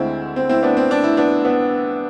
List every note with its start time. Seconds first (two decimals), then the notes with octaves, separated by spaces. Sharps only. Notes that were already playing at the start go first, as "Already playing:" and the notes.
Already playing: D2 D3 G#3 C4 E4
0.36 C4
0.49 C4 E4
0.63 B3 D4
0.77 C4
0.91 D4
1.04 E4
1.17 B3 D4
1.45 B3